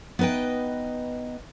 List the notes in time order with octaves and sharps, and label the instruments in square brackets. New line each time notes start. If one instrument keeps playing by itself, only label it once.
[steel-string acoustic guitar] B3 D#4 B4 D#5 G5